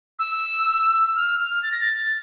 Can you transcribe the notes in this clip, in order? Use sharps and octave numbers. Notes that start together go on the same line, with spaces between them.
E6
F6
F6
A6
A#6
A6